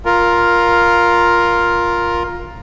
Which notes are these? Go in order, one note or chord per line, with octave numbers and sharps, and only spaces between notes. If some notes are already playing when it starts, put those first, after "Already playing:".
F4 A#4